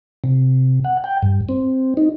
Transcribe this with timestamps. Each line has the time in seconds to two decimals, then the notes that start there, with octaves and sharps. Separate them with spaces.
0.24 C3
0.84 F#5
1.04 G5
1.22 G2
1.49 C4
1.97 D#4